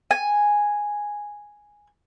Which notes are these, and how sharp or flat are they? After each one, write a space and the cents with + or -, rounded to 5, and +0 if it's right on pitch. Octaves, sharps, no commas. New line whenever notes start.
G#5 -5